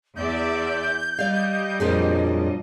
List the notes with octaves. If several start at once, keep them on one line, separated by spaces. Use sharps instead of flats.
E2 D5 E5 G6
G3 D5 D#5 F5
F2 A#2 F3 F#3 D4 G#4